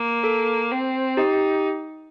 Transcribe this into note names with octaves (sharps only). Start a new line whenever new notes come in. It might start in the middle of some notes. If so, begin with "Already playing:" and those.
Already playing: A#3
A4
C4
D#4 G4
G4